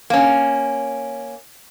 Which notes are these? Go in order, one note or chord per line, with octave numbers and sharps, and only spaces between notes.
A#3 C#4